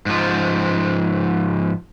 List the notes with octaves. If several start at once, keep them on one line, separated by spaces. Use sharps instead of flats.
G#2 F3